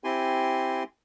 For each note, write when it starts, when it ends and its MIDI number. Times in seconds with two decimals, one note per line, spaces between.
0.04 0.83 60
0.04 0.83 64
0.04 0.83 67
0.04 0.83 80
0.04 0.83 84